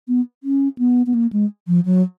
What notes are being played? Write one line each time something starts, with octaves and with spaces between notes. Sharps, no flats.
B3
C#4
B3
B3
A#3
G#3
F3
F#3